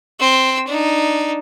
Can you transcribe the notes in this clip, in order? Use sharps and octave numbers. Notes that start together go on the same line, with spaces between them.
C4 E6
D4 D#4